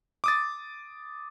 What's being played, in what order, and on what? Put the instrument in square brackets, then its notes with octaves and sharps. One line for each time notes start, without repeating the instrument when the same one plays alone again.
[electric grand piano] D6 D#6 A6